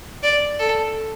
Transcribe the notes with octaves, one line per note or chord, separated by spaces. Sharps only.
D5
A4